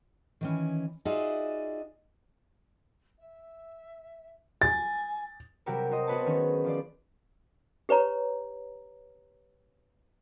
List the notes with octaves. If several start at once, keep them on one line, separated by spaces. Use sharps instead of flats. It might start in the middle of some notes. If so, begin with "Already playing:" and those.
D#3 E3 C#4
D#4 F4 F#4 G#4 D5 E5
E5
G#5 A6
C3 F#3 G3 F#4 G4 A#4
F#4 C5 D#5
B3 C4 F#4 B4 C#5 A5
D#3 G#3 C#4
F3 F4 D5
G4 B4 C#5 A#5